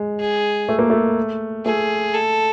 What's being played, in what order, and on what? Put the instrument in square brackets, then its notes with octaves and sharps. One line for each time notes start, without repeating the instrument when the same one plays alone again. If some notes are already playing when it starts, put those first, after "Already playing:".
Already playing: [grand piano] G#3
[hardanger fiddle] G#4
[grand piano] A3
A#3
A3
[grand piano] A3 [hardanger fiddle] G#4
[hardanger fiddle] A4